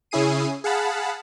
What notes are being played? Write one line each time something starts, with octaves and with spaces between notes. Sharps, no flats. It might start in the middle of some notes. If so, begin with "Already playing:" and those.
C#3 C#4 E4 G#4 C7 D#7
G#4 F5 F#5 A5 B5